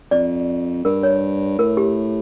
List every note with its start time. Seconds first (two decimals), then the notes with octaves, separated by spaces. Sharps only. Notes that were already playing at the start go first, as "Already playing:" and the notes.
0.11 F2 D5
0.84 G2 A#4
1.03 C#5
1.59 A2 A#4
1.77 G4